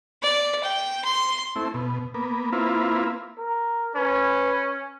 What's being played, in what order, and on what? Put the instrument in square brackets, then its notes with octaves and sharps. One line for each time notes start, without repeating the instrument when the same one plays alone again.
[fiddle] D5
G5
C6
[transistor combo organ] A3 C4 E4
B2
A#3 B3
A#3 C4 E4 F4 B4
[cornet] A#4
[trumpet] C#4 [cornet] B4